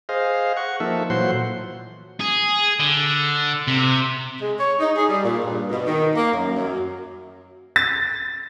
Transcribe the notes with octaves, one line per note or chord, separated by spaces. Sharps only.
G#4 C5 D#5 F5
F#5 C#6
F3 A#3 D#4 A4 E5
A#2 E3 F#3 C5 F#5 C6
G#4
D3
C3
G#3
C#5
D#4
G#4
G3
A#2
G2
B2
D#3
A#3
F#2
F#2
A6